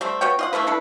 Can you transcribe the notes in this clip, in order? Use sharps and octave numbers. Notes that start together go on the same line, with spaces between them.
G3 A3 C4
B3 F#4 C#5 G5
F4 D#5 F#5
E3 A3 A#3 B4
D4 E4 A4 B4